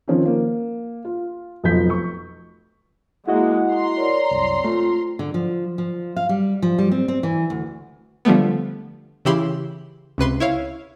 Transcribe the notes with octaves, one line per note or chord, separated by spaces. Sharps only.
D#3 F3 C4 C#4
A#3
F4
F1 B1 F3 G6 B6
C#6
G#3 A#3 E4 F#4 D#5 F#5
A#5 C6
A#4 C#5 D5
C2 F#2 C4
A3 F4
D3
F3
F3
F5
G3
F3
G3
C4
C4
E3
D2
D3 F3 G3 A3 B3
C#3 E3 E4 G4 B5 C6
C#2 C3 B4 C6
E4 C#5 F5